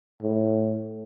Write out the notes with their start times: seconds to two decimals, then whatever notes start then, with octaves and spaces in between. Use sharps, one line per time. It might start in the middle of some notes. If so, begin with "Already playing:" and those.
0.22 A2